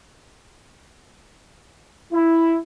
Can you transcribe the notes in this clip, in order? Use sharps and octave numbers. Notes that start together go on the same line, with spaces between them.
E4